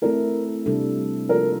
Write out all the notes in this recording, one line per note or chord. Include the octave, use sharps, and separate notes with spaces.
A3 C4 E4 A4 A#4
C3 G3 D4 A4
F3 A#3 F4 A4 A#4